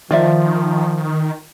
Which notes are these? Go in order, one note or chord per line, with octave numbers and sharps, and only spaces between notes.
D#3 F3 F4 D5 E5